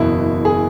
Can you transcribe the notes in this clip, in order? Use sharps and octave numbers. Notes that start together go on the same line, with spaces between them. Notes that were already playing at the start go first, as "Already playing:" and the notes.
Already playing: F#1 E2 B2 E4
G#4